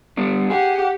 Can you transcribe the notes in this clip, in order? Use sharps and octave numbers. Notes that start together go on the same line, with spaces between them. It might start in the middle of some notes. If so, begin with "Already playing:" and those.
G3 B3 D4
G4 G#4 F#5